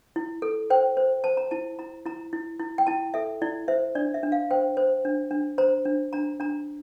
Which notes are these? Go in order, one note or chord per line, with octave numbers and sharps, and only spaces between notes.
E4
A4
C5 G5
C5
C5 A5
A#5
E4 A5
E4 A#5
E4 A#5
E4
E4
G5
E4 A5
A4 E5
E4 D5
C5 E5
D4 D5
E5
D4
F5
C5 G5
C5
D4
D4
C5 A#5
D4
D4 A#5
D4 A#5